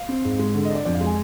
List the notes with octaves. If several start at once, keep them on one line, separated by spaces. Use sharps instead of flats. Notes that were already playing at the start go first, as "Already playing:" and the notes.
Already playing: F5
C4
G#2
G#3
D3
D#5
D4 D5
F2 D5
F5
G#3
G#5